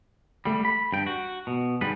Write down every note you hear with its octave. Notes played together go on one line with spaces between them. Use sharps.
G3 A3
B5
G2 G5
F#4
B2
G#2 G3 B4